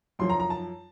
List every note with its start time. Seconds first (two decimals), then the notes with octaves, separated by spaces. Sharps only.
0.19 F#2 F3 C6
0.30 A#5
0.40 A#5
0.50 A5